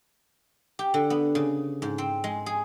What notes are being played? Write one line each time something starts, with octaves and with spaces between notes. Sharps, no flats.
G4
D3
B3
C#3
G#2
C4
G#3
G#4